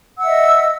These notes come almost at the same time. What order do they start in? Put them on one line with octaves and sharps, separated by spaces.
E6 F#5 E5 D#5